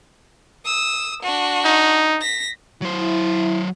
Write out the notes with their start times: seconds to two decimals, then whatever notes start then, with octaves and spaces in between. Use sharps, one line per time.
0.65 D#6 E6
1.22 D4 F#4
1.65 D#4
2.21 A#6 B6
2.82 F#3 E4 C5